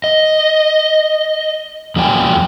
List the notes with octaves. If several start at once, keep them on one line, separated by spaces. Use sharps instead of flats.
D#5
E2 F#3 A#3 D5 G5 G#5